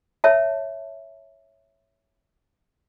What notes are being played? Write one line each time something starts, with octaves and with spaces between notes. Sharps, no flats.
C#5 E5 A5